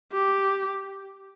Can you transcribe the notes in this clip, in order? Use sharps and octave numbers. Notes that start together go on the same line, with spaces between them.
G4